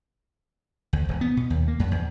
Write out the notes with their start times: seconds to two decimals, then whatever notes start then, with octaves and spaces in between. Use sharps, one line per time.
0.93 D2
1.08 E1
1.21 B3
1.37 B2
1.50 D#2
1.68 A#3
1.79 F#2
1.91 E2